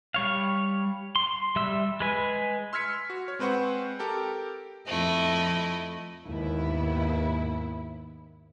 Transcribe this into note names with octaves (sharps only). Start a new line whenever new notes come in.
G3 C#5 F5
C6
G3 E5 E6
G#3 B4 G#5
C6 E6 F6 G#6 B6 C#7
F#4
C#5
G#3 C4 B4 C5 F#5 C#6
G4 A4 A#4 G5
F2 A3 E4 D#5
D#2 G#2 B3 E4